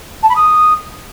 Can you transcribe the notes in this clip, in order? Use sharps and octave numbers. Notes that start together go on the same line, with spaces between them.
A5
B5
D#6